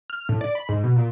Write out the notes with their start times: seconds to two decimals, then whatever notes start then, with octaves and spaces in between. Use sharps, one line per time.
0.10 F6
0.29 A2
0.41 D5
0.55 B5
0.69 G#2
0.84 B2
0.96 A#2